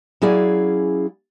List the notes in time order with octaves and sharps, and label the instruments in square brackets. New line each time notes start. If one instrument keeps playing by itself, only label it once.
[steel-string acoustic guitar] F#3 C#4 E4 G#4 D5 F5